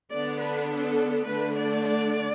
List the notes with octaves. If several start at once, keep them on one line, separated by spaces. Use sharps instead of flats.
D3 B3 D4 D5
B4
A4
D3 A3 D4 B4
D5
D5